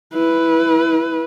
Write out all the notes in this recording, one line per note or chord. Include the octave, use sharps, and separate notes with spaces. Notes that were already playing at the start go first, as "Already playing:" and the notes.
E4 B4